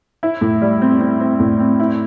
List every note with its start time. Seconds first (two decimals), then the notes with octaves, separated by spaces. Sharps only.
0.23 E4
0.41 A2
0.62 G3
0.82 C4
1.01 C4
1.20 C4
1.39 A2
1.60 C4
1.80 E4